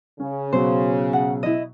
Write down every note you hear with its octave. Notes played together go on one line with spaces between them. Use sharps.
C#3 C#4
B2 F#3 F#4 C5
F#5
E4 D#5